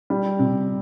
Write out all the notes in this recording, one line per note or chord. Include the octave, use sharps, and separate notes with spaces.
G3
C3